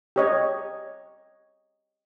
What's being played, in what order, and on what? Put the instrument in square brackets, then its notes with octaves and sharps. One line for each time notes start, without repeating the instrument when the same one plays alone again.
[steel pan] G4 C#5 D#5